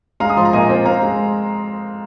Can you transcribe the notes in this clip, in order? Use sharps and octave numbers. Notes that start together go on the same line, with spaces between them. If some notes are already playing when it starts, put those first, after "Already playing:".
G#3 F5 A#5
D#6
F3 C6
A#5
A#2 D#5 G#5
C4
C4 F5 A#5
G#3